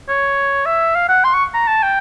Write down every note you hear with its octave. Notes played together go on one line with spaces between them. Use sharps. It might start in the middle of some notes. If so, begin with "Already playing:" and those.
C#5
E5
F5
F#5
C6
C#6
A#5
A5
G5